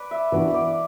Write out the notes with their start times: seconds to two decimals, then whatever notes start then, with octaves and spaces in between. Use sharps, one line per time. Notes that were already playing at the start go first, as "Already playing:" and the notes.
Already playing: B4 D5
0.11 E5
0.32 E3 B3 D4 F#4 D5
0.54 D5